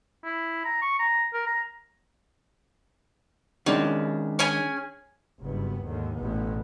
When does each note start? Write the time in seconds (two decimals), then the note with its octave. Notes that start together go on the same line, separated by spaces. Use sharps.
0.24 E4
0.65 A#5
0.82 C#6
0.99 A#5
1.33 A#4
1.46 A#5
3.66 D#3 G#3 C#4 D4
4.39 C#4 G#4 G#5
5.42 F#1 G2 B3
5.85 D#2 G#2 D3 D#3
6.16 A1 E2 B2 B3